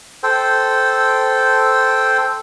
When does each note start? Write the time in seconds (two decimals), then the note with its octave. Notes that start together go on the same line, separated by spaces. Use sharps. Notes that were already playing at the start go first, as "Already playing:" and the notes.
0.23 A4 C5 G5